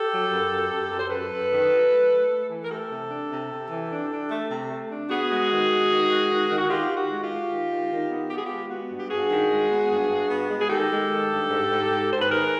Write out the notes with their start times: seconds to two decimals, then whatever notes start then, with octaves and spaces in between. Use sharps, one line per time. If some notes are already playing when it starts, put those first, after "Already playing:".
Already playing: G4 A4
0.11 F#3
0.30 F#2
0.51 F#2
0.70 F#2
0.91 F#2
0.99 C5
1.10 F#2 A4 B4
1.31 F#2
1.51 D#3
1.71 F#3
1.91 A3
2.10 A3
2.30 A3
2.50 E3
2.64 A#4
2.70 A3 G4 A4
2.90 C3
3.10 D4
3.30 C3
3.51 C3
3.70 E3
3.90 D4
4.10 D4
4.30 A3
4.50 C3
4.70 A3
4.90 D4
5.10 B3 F#4 G#4
5.30 G#3
5.51 D#3
5.70 G#3
5.90 D#3
6.10 G#3
6.30 D#3
6.50 D#3
6.58 F#4
6.70 D#3 F4 G4
6.91 D#3
6.97 F#4
7.11 G#3
7.23 F4 G4
7.31 G#3
7.50 D#3
7.71 D#3
7.91 D#3
8.10 B3
8.30 B3 G4
8.38 G#4
8.46 G#3 F4 G4
8.70 B3 F#4
8.90 G2
8.99 G4
9.10 G2 F#4 G#4
9.30 D#3
9.51 G#3
9.70 B3
9.90 G2
10.10 G2
10.29 B3
10.49 G#3
10.61 G#4
10.70 D#3 G4 A4
10.91 G#3
11.09 D#3
11.30 G2
11.50 G#2
11.71 G#2
11.91 G#2
12.11 G#2 C5
12.21 B4
12.30 D#3 G#4 A#4